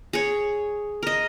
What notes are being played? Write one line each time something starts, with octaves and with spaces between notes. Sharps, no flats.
G#4 C#5
A#4 D#5